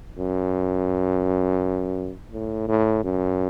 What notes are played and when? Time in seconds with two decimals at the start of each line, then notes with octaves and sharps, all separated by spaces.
0.18 F#2
2.33 A2
2.68 A2
3.04 F#2